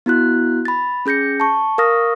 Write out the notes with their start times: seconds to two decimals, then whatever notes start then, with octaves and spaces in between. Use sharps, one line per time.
0.06 B3 E4 F#4 F#6
0.65 B5 A6
1.06 C#4 G#4 G6 A#6 C#7
1.40 A5 C#6
1.78 A#4 F5 C#6 D#6 F6 A#6